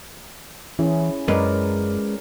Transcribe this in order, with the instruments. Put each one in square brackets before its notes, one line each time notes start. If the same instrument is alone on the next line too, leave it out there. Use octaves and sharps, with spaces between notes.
[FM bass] E3 [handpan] C#4 E4 G#4
[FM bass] F#2 [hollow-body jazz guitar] G#3 C#4 B4 [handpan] A#4 D5